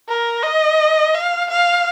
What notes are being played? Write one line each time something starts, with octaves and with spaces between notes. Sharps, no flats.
A#4
D#5
F5
F5